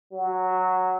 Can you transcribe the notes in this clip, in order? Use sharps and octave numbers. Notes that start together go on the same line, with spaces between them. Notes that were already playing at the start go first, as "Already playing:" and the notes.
F#3